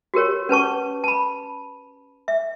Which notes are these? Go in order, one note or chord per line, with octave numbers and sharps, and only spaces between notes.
F#4 G4 A#4 C#5
C#4 B4 A5 C#6
A5 B5
E5